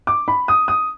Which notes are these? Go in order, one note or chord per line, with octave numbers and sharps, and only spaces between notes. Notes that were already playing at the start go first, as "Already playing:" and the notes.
D6
B5
D#6
D#6